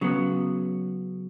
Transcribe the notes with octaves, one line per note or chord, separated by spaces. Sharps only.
C#3 F#3 B3